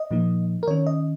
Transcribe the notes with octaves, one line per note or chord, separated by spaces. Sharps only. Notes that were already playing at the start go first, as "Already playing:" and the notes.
Already playing: D#5
A#2 F3 A#3 D#4
A#4
D#3 C#4 C#5
D#5